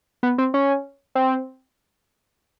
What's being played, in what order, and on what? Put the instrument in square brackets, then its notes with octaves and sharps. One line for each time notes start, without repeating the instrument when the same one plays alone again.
[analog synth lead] B3
C4
C#4
C4